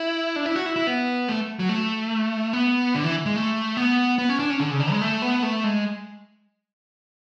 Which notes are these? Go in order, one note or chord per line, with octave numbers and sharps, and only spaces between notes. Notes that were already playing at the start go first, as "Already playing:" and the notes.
Already playing: E4
D4
E4
F#4
E4
E4
B3
A3
F#3
A3
B3
D3
E3
G#3
A3
B3
B3
C#4
D4
C#4
D3
C#3
D3
G#3
A3
B3
A3
G#3